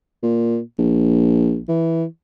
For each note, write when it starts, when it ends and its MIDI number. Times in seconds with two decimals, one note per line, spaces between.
0.23 0.60 46
0.79 1.60 34
1.68 2.05 52